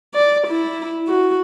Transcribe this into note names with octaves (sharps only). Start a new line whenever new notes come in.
D5
E4
F#4